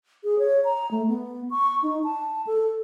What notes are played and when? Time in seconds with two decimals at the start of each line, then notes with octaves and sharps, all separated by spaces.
0.24 G#4
0.39 C#5
0.65 A#5
0.91 A3
1.08 B3
1.50 C#6
1.83 D#4
2.04 A5
2.47 A4